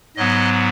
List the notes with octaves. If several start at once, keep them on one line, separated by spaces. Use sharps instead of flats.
G#2 F#3 B3 D#5